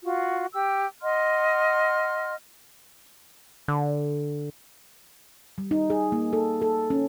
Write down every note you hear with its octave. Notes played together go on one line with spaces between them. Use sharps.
F4 F#4
G4 E6
D#5 F#5 C6 F6
D3
G3
D#4
G#4
A#3
A4
A4
C#4